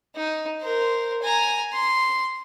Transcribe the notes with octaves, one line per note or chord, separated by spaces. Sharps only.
D#4
A#4 C5
G#5 A#5
C6